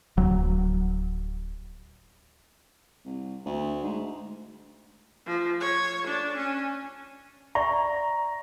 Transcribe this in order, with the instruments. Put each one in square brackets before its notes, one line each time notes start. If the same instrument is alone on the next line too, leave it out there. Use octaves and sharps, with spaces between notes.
[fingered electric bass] D1 F#3
[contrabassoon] C2
D2
G#2
[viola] F3
C#5
D4
C#4
[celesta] D5 E5 C#6 [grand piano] A#5